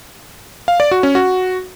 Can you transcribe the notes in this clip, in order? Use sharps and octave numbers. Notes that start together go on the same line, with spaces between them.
F5
D5
F#4
C#4
F#4